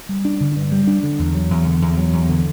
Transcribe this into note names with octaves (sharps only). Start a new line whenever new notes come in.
G3
D4
D3
G2
G3
D4
D3
E2
F#3
E2
D3
E2
F#3
E2
D3